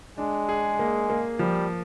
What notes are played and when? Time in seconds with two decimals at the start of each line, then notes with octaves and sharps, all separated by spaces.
0.18 G#3 D4
0.49 G#4
0.79 A#3
1.10 A#3
1.39 F3 G3